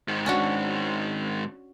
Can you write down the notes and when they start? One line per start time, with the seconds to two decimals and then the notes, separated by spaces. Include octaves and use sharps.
0.08 G#2 D#3
0.26 C#4 D4 F#4